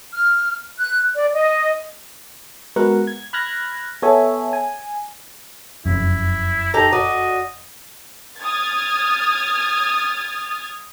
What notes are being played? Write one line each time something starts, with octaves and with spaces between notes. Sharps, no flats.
F6
F#6
D5
D#5
G#3 B3 F#4 A#4 B4 F#5
G#6
B5 F6 F#6 G#6 A#6
B3 G#4 A4 C#5 E5 G#5
G#5
F1 F#2 E4
D#4 G4 A4 A#5
F#4 D5 D#5
D#6 F6 G#6 A6